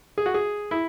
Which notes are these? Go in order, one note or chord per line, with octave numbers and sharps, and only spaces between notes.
G#4
F#4
G#4
E4